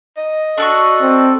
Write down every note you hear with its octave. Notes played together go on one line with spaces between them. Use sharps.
D#5
D4 F#4 A4 C#6
C4